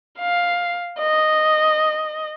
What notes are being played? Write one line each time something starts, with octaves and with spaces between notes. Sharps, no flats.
F5
D#5